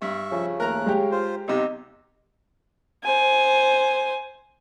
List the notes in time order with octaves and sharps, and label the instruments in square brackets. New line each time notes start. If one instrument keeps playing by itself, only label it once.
[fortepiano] G2 [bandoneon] E5 C#6
[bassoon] C#3 [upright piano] F3
[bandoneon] D#2 A3 F#6 [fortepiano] A#4 A#5
[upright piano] G#3 G4
[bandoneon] F4 C5
[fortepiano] B1 C3 [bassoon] D#4 [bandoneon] G4
[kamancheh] C5 G#5